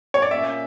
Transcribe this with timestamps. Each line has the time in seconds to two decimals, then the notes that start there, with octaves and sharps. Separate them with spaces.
0.14 C#5
0.22 D5
0.31 A#2 A#3 C#4 E5